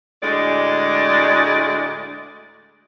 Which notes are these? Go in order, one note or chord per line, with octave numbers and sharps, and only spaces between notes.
D2 A2 G#3 D5